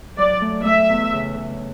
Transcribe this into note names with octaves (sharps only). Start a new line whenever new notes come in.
F#3 D5
A3
A3 E5
E2
C#3
C#3